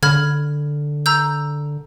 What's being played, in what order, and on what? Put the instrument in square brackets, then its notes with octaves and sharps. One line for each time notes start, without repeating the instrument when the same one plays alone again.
[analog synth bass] D3 [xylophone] B5 F6 G#6
[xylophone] A#5 E6 G6